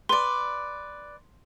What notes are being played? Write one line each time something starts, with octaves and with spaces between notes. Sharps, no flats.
B4 D5 C6